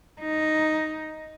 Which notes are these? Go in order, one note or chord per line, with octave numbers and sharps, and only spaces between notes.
D#4